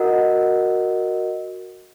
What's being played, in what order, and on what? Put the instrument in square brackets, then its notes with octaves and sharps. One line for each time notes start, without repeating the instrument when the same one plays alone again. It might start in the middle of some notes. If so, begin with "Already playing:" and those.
Already playing: [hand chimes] F#4 A#4 D#5 F#5